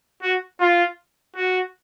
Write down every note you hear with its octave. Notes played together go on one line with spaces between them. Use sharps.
F#4
F4
F#4